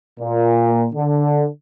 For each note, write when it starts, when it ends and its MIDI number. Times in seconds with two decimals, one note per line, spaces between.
0.19 0.85 46
0.95 1.46 50